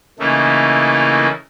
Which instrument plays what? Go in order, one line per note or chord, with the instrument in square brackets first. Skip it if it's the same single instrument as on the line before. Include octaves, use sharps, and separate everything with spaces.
[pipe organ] C#3 E3 A3 A#3 D#4 E4